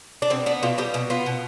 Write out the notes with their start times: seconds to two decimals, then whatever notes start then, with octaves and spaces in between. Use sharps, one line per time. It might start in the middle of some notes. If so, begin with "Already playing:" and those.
0.22 D4
0.30 B2 C4
0.46 B3 D4
0.63 B2 F4
0.78 G3 G4
0.94 B2
1.10 B3 F4
1.26 B2